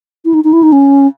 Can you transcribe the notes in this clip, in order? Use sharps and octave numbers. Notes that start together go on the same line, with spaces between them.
E4
D#4
D#4
E4
D#4
C#4